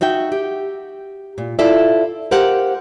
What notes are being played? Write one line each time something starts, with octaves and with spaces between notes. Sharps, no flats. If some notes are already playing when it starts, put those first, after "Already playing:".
D#4 F#4 E5 G5
G4
A#2
E4 F4 A4 D5 E5
G4 A#4 C5 F5 F#5